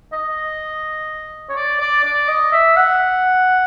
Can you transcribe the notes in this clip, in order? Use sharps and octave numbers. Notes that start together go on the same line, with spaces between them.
D#5
C#5
D5
D5
D5
D#5
E5
F#5